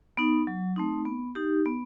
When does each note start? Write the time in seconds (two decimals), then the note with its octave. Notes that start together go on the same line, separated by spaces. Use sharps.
0.17 B3 D#4
0.47 F#3
0.76 A3 C4 D#4
1.05 B3
1.35 D#4 G4
1.66 B3